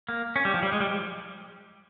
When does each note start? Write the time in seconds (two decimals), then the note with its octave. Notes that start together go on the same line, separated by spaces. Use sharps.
0.09 A#3
0.36 C#4
0.45 G3
0.54 F3
0.63 G3
0.72 G#3
0.80 G3
0.89 F3